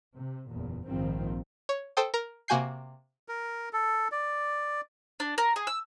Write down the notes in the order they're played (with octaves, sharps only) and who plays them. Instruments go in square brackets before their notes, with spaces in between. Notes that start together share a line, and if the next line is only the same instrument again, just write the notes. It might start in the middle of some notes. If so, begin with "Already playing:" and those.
[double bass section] C3
F#1 E2 A#2
A#1 G#2 D#3 F3 C4
[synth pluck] C#5
A4 C5 G5 D#6
A#4
C3 A#3 F#4 G#5 G6 C7
[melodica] A#4
A4
D5
[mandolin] D4
A#4
G#4
E6